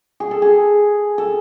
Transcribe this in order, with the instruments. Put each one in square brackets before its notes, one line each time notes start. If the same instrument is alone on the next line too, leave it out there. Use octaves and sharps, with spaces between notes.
[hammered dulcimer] G#4
A4
G#4
A4